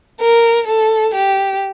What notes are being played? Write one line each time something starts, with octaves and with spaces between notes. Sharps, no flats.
A#4
A4
G4